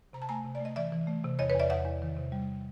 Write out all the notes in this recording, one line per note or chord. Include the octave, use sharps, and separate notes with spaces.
C3 A#5
A5
A3 G#5 A#5
C3
D5
A3 D#5
E3 D5 E5
E3
A3
C3
E2 C#5 D#5
B4 C#5
E2 D5 E5
E2 E5 F#5
E2
D#3
C3
G3